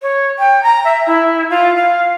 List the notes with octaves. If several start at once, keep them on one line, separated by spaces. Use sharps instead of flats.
C#5
G5
A#5
E5
E4
F4
F5